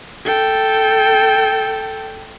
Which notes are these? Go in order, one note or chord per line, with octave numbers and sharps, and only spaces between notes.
A4 G5